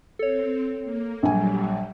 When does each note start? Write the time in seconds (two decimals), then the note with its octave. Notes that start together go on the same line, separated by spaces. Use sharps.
0.19 C4 A4 C#5
0.84 A#3
1.23 A#1 F#3 G3 G#5